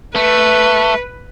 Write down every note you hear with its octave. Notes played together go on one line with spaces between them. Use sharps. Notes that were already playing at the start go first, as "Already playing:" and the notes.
A3 B4